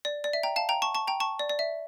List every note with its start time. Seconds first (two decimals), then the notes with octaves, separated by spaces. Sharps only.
0.05 D5
0.24 D5
0.33 E5
0.43 G5 A#5
0.56 F5 A5
0.69 G5 A#5
0.82 A5 C#6
0.95 A5 C#6
1.07 G5 A#5
1.20 A5 C#6
1.39 D5
1.49 D5
1.59 E5